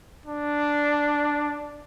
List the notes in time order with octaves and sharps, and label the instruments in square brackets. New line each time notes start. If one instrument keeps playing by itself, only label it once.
[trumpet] D4